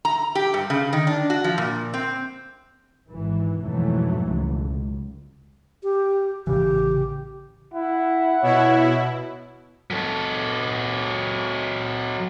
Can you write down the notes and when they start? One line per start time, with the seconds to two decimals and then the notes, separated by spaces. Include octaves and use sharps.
0.05 A#5
0.35 G4
0.54 G2
0.70 C#3
0.93 D#3
1.07 D4
1.30 F#4
1.44 F3
1.58 A#2
1.94 C4
3.10 G#1 E3
3.61 F2 G#2 B2 E3 F#3 A3
4.29 C#2
5.83 G4
6.47 A1 C#3 E3 G4
7.74 E4 F#5
8.42 B2 E4 C#5
9.90 F#3 A4